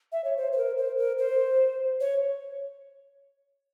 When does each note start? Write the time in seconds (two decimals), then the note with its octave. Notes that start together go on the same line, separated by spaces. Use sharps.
0.12 E5
0.24 C#5
0.37 C5
0.52 C5
0.58 A#4
0.78 C5
0.98 A#4
1.18 C5
2.00 C#5